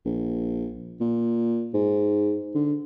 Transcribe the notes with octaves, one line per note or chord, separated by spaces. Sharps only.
A#1
A#2
G#2
D3